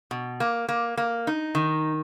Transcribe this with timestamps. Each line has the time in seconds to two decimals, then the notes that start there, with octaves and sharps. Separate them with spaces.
0.11 B2
0.40 A#3
0.69 A#3
0.97 A#3
1.27 D#4
1.55 D#3